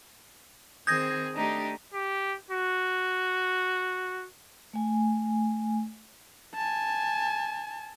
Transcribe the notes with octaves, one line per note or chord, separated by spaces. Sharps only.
D#3 C4 G#4 D#6 G6 G#6 A#6
A3 D4 D#4 G4
G4
F#4
A3 G#5
G#5 A5